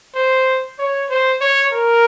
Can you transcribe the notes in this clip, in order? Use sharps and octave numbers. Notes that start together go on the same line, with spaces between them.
C5
C#5
C5
C#5
A#4